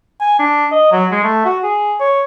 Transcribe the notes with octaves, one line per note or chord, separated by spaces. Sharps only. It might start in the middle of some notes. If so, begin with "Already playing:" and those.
G#5
D4
D#5
F#3
G#3
A3
F#4
G#4
C#5